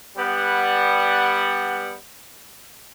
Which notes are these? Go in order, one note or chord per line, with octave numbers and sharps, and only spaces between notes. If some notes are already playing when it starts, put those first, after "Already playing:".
G3 B3 F#5